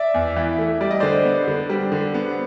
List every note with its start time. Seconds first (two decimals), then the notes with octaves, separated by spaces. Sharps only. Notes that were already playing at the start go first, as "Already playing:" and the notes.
Already playing: D5 E5
0.14 E2
0.36 E3
0.58 A3
0.81 G3 D5
0.91 D#5
1.00 D3 C5 D5
1.25 B3
1.48 D3
1.69 G3
1.92 D3
2.14 B3